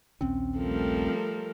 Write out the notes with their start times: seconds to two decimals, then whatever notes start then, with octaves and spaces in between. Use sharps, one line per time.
0.21 A#1 D#2 C4 C#4
0.58 F3 G3 A3 A4 A#4